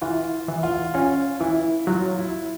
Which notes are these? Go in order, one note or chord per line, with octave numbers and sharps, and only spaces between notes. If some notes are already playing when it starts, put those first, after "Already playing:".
E3 F4
E3
F4
C#4 F4
E3 E4
F#3 F4
E4